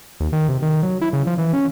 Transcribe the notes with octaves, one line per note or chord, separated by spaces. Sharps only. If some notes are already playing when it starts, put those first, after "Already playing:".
D#2
D#3
C3
D#3
F#3
E4
C#3
F3
E3
C#4